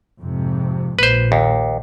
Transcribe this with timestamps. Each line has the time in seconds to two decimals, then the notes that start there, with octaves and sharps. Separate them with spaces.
0.19 F2 G#2 C3
0.99 A#1 A#2 B4 C5
1.32 D#2